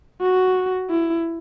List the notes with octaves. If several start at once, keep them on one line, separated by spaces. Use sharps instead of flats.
F#4
E4